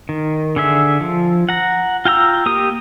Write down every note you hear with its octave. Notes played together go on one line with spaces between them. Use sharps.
D#3
D3 G#4 E5
F3
F#5 A#5
F4 G5 A#5 E6
A#3 G4 A#4 D#6